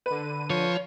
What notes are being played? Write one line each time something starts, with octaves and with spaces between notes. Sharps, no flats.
D3 B4 D#7
F3 C#5